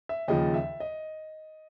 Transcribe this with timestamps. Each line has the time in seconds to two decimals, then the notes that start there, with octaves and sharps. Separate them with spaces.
0.09 E5
0.28 D#2 C#3 F3 D#5
0.54 E5
0.80 D#5